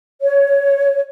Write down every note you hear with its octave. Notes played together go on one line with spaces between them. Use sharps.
C#5